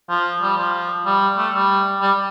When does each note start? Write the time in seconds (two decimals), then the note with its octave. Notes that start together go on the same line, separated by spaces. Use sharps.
0.09 F3
0.42 G3
0.57 F3
1.05 G3
1.37 A3
1.54 G3
2.01 G3